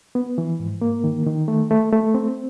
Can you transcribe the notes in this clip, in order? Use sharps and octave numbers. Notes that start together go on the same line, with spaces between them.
B3
E3
G#2
A#3
D#3
D#3
A3
A3
A3
C4